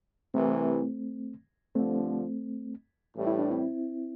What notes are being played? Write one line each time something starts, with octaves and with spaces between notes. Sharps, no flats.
C2 C3 E3 A3 C4
G2 D3 F3 A3 C4
A1 A2 E3 G3
E4
D4
C4 E4